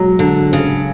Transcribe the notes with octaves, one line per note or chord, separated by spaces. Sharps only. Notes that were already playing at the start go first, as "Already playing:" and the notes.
Already playing: F#3 G#3
D3
C#3